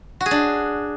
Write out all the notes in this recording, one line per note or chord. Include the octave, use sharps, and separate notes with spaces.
F#4
G#4
D4